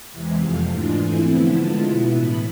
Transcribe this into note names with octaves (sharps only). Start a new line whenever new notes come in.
E2 C3 E3 G#3
F2 C3 F3 A3 F5
G#2 E3 G#3 D4 F4
E3 A3 C4 E4 G#5
D3 F3 B3 E4
D3 G#3 B3 F4 A5
B2 B3 E4
A2 E3 B3 B5